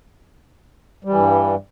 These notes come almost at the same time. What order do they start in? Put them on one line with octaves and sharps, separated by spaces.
G3 E3 G2